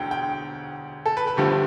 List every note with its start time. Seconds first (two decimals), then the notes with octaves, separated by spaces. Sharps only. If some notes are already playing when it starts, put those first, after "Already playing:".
Already playing: E1 D2 D3 G5
0.11 G5
1.06 A4
1.17 B4
1.27 B4
1.37 G1 G2 D3 F3 A3 G4